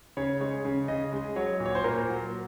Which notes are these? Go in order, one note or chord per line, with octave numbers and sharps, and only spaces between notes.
C#3 C#5
G#3 C#5
C#3
C#3 D#5
G#3
F#3 C#5
A#2
C#5
C5
A#2 A#4
F#3